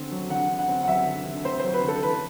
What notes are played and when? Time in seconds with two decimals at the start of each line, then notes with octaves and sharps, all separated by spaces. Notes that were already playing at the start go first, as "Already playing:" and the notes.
Already playing: D3 C4
0.12 F#3
0.30 D3 F#5
0.49 D3
0.59 F#5
0.69 C4
0.83 F#5
0.88 F#3 E5
1.07 D3
1.27 D3
1.45 C4 C5
1.60 F#3 C5
1.74 B4
1.83 D3
1.88 A4
2.03 E3 B4